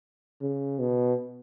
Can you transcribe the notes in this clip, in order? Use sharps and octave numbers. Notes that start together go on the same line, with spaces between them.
C#3
B2